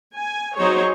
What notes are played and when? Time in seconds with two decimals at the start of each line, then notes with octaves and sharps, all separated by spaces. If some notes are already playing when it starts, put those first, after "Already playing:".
0.16 G#5
0.56 F#3 C4 D#4 G#4 C5 C#5